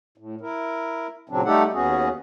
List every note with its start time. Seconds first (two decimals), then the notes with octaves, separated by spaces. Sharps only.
0.18 A2
0.41 E4 A#4
1.29 A#2 C#3 F#3 C4 D4
1.45 G3 A3 D#4 G4 A4 F#5
1.73 D#2 B3 C#4 F#4 G#4